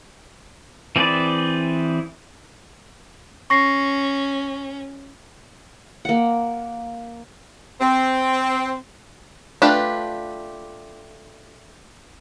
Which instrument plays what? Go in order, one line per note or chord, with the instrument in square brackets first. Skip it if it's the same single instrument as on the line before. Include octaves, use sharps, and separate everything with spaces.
[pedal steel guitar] E3 C4 G#4 B4 D5
[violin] C#4 [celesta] C#6 A#6 C7
[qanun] A#3 F#5
[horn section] C4
[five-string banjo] A3 D4 F4 G4 B4